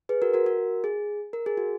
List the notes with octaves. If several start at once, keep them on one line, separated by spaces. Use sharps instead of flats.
G#4 B4
F#4 A#4
F#4 A#4
F#4 A#4
G#4
A#4
G#4
F#4